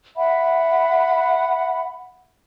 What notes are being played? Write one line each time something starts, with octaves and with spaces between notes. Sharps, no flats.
E5 F#5 B5